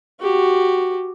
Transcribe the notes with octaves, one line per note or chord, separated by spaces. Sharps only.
F#4 G4